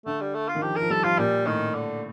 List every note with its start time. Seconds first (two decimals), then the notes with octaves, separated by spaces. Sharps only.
0.06 D3 A3
0.20 G3
0.34 A3
0.49 F4
0.55 D#3
0.62 F3 G4
0.76 A#4
0.82 F3
0.90 G3 A4
1.04 F3 F4
1.18 A#2 G3
1.46 A2 D#3
1.74 D3